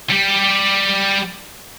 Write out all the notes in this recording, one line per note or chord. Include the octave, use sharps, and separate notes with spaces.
G3 G4